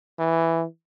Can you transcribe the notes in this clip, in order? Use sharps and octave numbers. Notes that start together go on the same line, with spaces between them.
E3